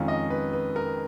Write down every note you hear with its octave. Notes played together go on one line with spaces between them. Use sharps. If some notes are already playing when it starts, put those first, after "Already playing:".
Already playing: F2 D#3 G#3 C#4 F5
D#5
B4
B4
A#4